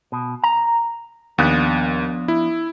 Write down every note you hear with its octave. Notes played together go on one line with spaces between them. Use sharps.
B2
A#5
D#2 F3 B3 D4
E4